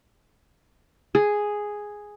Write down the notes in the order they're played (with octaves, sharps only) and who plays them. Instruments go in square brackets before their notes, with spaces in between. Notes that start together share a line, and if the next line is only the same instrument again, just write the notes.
[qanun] G#4